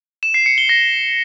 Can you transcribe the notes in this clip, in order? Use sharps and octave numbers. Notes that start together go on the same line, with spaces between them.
E7
C7
C#7
G7
A#6